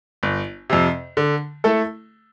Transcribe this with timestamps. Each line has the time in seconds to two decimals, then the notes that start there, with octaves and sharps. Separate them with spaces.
0.23 G1
0.70 F2 C3
1.17 D3
1.64 A3 E4 A4